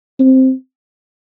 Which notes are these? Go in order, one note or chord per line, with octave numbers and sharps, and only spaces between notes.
C4